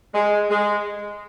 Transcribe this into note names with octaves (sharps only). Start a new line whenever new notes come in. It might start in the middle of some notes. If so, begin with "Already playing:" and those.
G#3
G#3